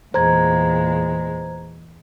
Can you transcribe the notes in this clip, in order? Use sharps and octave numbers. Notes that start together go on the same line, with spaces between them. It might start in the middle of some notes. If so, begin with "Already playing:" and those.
E2 A#2 G#3 C5 A#5 G#6